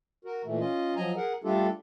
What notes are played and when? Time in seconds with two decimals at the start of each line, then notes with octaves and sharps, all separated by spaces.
0.25 F#4 A#4
0.45 A#2 E3 A3
0.60 C#4 F4 D#5
0.96 F3 F#3 D#5 G#5 A#5
1.16 G#4 A#4 F#5
1.44 G3 A3 D4 F4 G4 A4